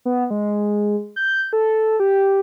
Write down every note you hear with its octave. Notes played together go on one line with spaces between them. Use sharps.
B3
G#3
G6
A4
G4